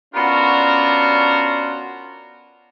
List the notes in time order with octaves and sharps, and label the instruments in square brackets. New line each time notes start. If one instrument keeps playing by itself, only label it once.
[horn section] B3 C#4 D4 F4 F#4 A#4